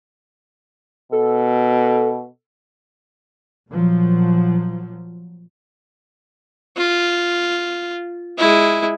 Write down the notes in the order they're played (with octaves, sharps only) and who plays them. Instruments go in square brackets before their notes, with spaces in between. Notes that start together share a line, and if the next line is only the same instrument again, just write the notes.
[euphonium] B2 [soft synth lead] A4
[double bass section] A#2 F3 F#3
[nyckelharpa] F4
G#3 E4